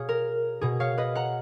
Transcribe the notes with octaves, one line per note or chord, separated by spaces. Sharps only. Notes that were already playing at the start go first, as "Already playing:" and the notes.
Already playing: B2 G#4 C#5 F5
A#4
B2 G#4
C#5 F5
B4 D#5
F#5 A#5